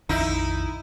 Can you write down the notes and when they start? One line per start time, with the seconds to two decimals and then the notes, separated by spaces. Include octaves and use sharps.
0.09 A#1 F2 D#3 D#4 E4